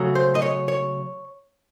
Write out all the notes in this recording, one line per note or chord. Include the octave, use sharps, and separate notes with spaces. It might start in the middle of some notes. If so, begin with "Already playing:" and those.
Already playing: C#3 F#3 A3
C5
D#5
C#5
C#5